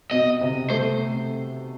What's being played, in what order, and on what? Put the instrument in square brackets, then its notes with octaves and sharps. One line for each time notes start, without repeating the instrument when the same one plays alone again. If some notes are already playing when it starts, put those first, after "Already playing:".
[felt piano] B2 [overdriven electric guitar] D#5
[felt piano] C3
[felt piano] A3 [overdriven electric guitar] C5